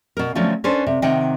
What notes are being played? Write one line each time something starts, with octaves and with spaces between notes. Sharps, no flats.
B2 A#4
D3 F3 F#3 A3 C4 C#4
C#4 D4 A4 B4 C5
C3
C3 D#3 D#5 F#5 G5